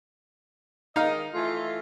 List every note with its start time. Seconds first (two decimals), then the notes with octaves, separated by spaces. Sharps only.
0.96 D#3 G#3 D#4 D#5 F5
1.33 E3 A3 F4